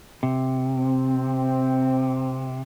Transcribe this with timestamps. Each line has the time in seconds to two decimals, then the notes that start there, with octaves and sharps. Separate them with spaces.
0.23 C3
0.77 C4